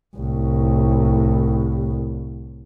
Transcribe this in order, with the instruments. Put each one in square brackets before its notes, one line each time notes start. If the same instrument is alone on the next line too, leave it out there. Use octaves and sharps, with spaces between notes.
[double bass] C2 A2